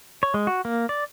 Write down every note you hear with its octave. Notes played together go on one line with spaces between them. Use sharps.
C#5
G#3
F#4
A#3
D5